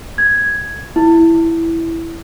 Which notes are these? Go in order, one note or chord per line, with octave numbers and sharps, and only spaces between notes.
G#6
E4